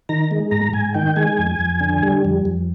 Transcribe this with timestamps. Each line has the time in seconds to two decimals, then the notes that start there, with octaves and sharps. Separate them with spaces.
0.09 D#3 A#5
0.31 G#3
0.51 G#2 A#5
0.73 G#2 G#5
0.94 D#3 G5
1.16 G#3 G#5
1.38 F2
1.59 F2
1.81 D3
2.03 G3
2.25 F2
2.45 F2